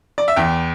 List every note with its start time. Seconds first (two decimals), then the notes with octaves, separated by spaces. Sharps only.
0.18 D5
0.28 E5
0.36 E2 G5